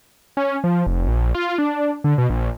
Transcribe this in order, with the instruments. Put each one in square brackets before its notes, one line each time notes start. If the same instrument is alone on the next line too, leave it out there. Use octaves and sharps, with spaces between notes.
[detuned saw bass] C#4
F3
F1
A#1
F4
D4
D3
B2
A#1